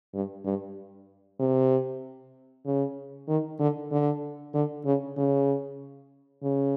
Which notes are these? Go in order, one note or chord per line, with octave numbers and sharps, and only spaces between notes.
G2
G2
C3
C#3
D#3
D3
D3
D3
C#3
C#3
C#3